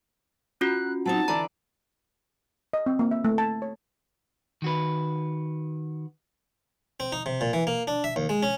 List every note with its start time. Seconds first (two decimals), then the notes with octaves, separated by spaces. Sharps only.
0.61 C#4 F4 F#4 F#6
1.06 F#3 C4 D#4 A5
1.28 D3 E3 D5 A#5
2.73 D#5
2.86 C4
2.99 A#3
3.11 E5
3.25 A3
3.38 A5
3.62 C#5
4.62 D#3 F#4 B4
7.00 C4
7.12 D#4
7.26 C3
7.41 A#2
7.53 E3
7.67 A#3
7.88 D4
8.04 E5
8.16 D#2
8.29 G#3
8.43 C#4